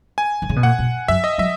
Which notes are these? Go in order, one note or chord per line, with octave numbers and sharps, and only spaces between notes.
G#5
D#3
C#3
B2
A#2 F#5
B2
F#2 E5
D#5
F#3 E5